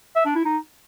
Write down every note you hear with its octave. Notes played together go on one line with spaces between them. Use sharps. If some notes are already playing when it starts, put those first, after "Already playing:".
E5
D4
E4
D#4